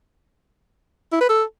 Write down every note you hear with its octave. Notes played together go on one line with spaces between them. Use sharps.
E4
B4
A4